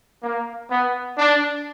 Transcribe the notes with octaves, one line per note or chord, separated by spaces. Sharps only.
A#3
B3
D4